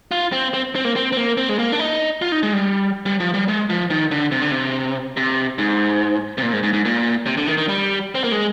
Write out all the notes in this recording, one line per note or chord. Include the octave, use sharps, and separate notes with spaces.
F4
C4
C4
C4
A#3
C4
C4
A#3
C4
G#3
A#3
D4
D#4
F4
D#4
G#3
G3
G3
F3
G3
G#3
F3
D#3
D3
C3
D3
C3
C3
G#2
C3
A#2
G#2
G#2
G#2
A#2
C3
D3
D#3
D#3
G3
C4
A#3
G#3